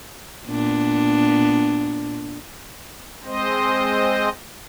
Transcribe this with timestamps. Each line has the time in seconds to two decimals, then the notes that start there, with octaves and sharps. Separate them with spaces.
0.46 A#2 B3 D4
3.25 G#3 C4 C5 D#5